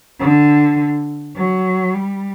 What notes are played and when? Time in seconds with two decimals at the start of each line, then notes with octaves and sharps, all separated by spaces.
0.20 D3
1.36 F#3
1.94 G3